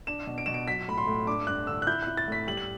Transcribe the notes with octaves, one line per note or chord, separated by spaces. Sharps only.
D4 E7
B2
D7
B2 E7
D7
F#3 B6
A2 B5
C6
A2
D4 D6
G2 F#6
D3 E6
F#6
E4 G6
E4 F#6
A6
A2 B6
G3 F#7
F#7